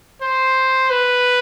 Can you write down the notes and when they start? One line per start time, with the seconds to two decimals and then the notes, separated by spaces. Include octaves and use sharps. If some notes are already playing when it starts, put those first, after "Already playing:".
0.22 C5
0.90 B4